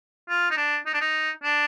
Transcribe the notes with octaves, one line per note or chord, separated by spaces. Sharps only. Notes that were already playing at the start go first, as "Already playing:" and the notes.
F4
D#4
D4
D#4
D4
D#4
D4